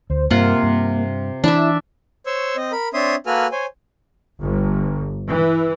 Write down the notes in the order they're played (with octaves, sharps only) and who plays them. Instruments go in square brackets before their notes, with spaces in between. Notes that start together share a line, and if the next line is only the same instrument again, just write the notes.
[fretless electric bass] D2 [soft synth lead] C5
[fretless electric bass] G2 [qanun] C3 F4 F#5 [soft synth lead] A#3
[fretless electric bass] G2
[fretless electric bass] E3 [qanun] D4 E5 [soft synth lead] E4
[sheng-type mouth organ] C5 C#5 C#6 E6
C4 D#5
A#4 B5
C4 D4 C#5 E5 C6 D#6
A#3 F#4 A4 B4 G#5 F6
C5 C#5 G#5
[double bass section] G1
E3